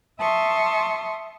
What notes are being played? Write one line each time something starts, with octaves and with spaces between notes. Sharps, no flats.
E5 A5 C6 C#6 D#6